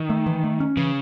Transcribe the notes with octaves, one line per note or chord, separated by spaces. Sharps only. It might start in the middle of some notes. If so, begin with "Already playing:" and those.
Already playing: D#3
A3
E3
A3
C#4
C#3 E3